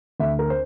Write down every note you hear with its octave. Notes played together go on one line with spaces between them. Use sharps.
D2 E5
A#4
C5